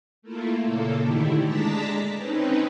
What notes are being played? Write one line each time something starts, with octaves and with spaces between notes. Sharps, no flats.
A3 A#3 E4 F4
A#2 C#3 A#3 A4
G#2 D3 D#3 A3 E4 G4
G#3 D4 A5 A#5 A6 B6
C4 C#4 D#4 B4